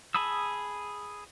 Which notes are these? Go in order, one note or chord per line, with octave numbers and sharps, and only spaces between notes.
G#4 A5 B5 D#6 E6